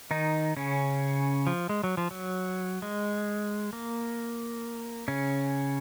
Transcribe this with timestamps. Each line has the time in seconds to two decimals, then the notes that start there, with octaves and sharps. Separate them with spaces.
0.11 D#3 D#4
0.57 C#3 C#4
1.47 F3
1.69 G#3
1.84 F#3
1.97 F3
2.11 F#3
2.82 G#3
3.73 A#3
5.08 C#3 C#4